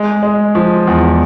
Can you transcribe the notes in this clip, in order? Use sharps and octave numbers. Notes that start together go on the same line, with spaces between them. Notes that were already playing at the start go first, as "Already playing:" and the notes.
Already playing: G#3
G#3
F3
E2